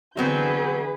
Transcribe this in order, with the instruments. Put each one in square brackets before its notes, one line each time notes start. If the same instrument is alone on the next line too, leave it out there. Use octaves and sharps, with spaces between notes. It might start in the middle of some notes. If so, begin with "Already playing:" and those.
[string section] D3 E3 G6 [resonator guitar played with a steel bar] F#3 B3 C4 [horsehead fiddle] G#4 B4